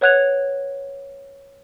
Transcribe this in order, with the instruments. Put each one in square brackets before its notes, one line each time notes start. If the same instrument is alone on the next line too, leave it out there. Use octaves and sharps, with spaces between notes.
[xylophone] B4 C#5 F#5 F#6 G#6 F7